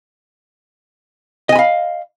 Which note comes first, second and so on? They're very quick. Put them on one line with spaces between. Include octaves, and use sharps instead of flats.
D#5 G#5 B5 F5